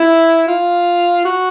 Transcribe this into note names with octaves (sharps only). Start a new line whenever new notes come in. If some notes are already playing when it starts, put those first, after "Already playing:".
Already playing: E4
F4
F#4